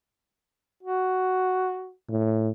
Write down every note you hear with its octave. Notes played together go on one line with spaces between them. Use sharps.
F#4
A2